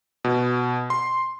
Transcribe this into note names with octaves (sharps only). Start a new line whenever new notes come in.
B2
C6